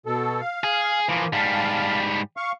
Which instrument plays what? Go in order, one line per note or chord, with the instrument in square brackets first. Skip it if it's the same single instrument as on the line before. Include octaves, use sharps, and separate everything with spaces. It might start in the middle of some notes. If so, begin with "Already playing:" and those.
[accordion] B2 A4
F5
[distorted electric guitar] G#4
[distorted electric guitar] E3 F3 [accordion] A#3
[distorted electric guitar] G#2 G3 [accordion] F5 A5
[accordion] F5 C#6